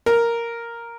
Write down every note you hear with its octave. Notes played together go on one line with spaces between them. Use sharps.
A#4